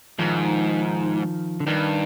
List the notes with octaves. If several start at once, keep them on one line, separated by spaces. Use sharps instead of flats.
G#2 D#3 F3
D3
G2 D#3